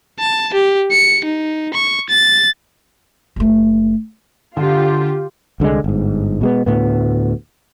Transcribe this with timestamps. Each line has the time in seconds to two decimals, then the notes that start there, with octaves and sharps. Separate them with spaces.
0.19 A5
0.54 G4
0.92 C#7
1.25 D#4
1.74 C#6
2.10 A6
3.36 F#1 A3
4.57 D3 F4 G4
5.60 C2 D3 F#3 G#3
5.84 G1 G#2
6.41 B2 G#3 B3
6.66 D2 A2 B3